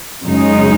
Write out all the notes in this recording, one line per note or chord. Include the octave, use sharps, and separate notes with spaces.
F#2 C#3 G#3 D#4